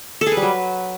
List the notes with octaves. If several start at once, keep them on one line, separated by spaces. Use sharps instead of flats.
A4
G#4
B4
G3
F#3